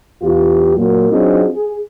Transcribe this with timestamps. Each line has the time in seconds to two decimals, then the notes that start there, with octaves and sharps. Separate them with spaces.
0.22 E2 F4 G4
0.76 A#2 F#3 A#3
1.11 F#3 C4 D4 D#4 F4 G#4
1.54 G#4